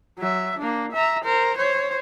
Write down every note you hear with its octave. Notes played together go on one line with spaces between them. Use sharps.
F#3 E5
A#3 D4
E5 A#5
A#4 C5
C5 C#5